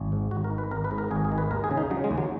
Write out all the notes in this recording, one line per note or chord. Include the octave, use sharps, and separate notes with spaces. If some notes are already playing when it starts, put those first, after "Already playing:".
Already playing: G#1
G#2
G#1 F#4
A#4
D#3
B4
G#1 A#4
B4
G#2
A#4
G#1 G#4
G#4
D#3
B4
D#2 A#4
G#4
C#3
D#4
C#3 F#3
G#3
D#2
F#3